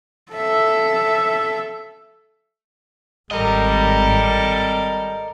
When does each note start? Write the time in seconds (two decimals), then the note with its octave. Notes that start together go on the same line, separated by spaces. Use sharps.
0.32 A4 E5
3.31 G#1 G3 A4 A#4 D#5